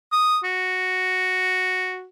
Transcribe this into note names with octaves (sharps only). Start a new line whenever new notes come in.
D#6
F#4